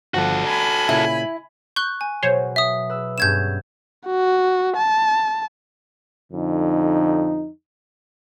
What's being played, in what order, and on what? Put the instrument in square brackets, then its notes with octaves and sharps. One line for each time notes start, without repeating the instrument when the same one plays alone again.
[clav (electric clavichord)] G1 F3 F#5 [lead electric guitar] F#4 A4
[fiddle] G#5 B5 [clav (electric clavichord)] A#5
[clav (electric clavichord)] A#2 C#3 [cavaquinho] E4
[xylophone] C#6 F#6 [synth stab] G6
[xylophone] G#5
[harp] B2 F#3 [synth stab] C5 C#5
[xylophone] E5 D#6
[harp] B4 E6
[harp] G2 B3 C#4 [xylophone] G6 G#6 E7
[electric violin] F#4
A5
[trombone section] F2 D3 D#4